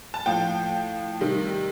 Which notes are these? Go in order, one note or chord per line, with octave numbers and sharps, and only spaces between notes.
A5
A2 F3 G5
C3 D#3 G3